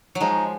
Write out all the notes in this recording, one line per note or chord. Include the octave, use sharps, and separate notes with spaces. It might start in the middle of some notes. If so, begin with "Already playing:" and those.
F#3
F3 G#3 D#4